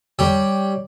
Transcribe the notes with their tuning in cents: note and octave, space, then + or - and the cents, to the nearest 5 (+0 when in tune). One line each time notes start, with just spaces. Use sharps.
G3 +0 G4 +0 C#5 +0